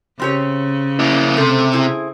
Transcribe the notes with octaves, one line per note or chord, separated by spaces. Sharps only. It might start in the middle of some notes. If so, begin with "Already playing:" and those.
C#3 C4 G4 C#5
A#3 E4
C3 A3 C4
C4 E4 G#4